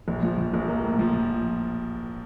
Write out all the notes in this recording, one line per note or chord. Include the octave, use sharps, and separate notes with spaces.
A#1
F3
F3
A#1
A#3
A2
F3